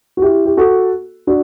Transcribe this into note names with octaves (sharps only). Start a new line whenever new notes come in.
F#4
E4 G4
G4
F#4 A4
D4 F#4